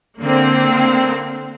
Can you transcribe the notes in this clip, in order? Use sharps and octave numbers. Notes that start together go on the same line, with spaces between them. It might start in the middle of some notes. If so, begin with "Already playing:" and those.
D3 A#3 C4